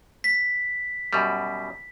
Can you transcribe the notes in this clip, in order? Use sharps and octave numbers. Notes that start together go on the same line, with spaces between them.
B6
F#2 B2 G3